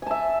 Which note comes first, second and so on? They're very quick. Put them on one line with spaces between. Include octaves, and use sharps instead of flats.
G#5 A5 E5